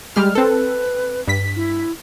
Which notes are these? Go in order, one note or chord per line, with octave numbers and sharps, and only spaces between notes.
G3 G#3 G4 F6
C4 A4 B4
G2 B6
E4